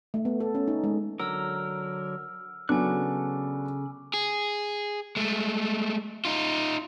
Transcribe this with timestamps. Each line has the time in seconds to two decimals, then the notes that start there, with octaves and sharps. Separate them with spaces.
0.14 A3
0.25 B3
0.40 A4
0.55 C#4
0.68 D#4
0.84 G#3
1.20 D3 F#3 A#4 E6 F6
2.69 C#3 F#3 B3 D4 A4 G#5 D6 F#6
4.14 G#4
5.16 G#3 A3
6.25 D#4 F4